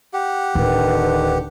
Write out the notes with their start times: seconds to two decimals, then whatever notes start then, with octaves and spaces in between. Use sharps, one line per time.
0.13 G4 F#5
0.55 D1 D3 D#3 B4